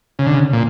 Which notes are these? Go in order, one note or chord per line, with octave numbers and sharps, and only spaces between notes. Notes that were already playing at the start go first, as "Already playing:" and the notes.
C#3
D3
C#3
A#2